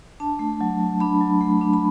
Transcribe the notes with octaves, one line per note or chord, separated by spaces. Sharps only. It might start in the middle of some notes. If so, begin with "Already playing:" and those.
D4 A5
A3
F#3
F#3
D4 B5
F#3
A3
D4
B5